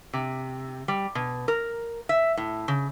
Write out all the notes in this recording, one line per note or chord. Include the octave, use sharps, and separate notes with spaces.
C3
G3
B2
A#4
E5
A2
C#3